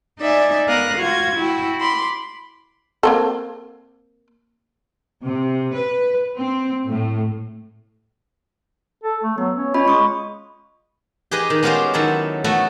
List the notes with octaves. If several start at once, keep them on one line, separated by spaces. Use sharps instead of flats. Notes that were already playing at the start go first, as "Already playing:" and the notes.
D#4 D5 E5 G#5
B3 A#4 F5 D#6 F#6
F4 F#4 G#6
E4 F#4 G5
B5 C6 D6
A#3 C4 A4
C3
B4
C4
A2
A4
A3
F#3 B3
C#4
C#4 F4 D#5 B5
G#3 C#6 D#6
G4 G#4 B4 D#5
D#3
G#3 B3 C#4 F4 G4 C5
D#3 F#3 E4 A4
A3 B3 F#4 E5